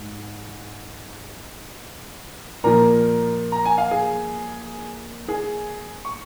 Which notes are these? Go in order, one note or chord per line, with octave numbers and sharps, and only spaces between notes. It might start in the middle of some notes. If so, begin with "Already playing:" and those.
Already playing: G#2
A#2 F3 A#3 A#4 A#5
A#5
G#5
F5
G#4 G#5
G#4 G#5
C#6